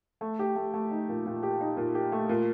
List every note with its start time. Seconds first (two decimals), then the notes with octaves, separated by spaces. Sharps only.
0.21 A3
0.39 G4
0.56 A3
0.74 A3
0.91 D#4
1.09 A#2
1.26 A#2
1.43 G4
1.61 D#4
1.77 A#2
1.95 G4
2.12 A3
2.29 A#2